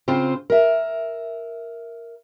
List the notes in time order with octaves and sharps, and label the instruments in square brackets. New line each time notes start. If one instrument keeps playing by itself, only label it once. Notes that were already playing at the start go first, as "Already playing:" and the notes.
[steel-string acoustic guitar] C#3 C4 F4 C5
A#4 E5